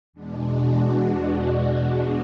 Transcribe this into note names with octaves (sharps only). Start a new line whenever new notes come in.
E2 B2 G#3 D4
F#4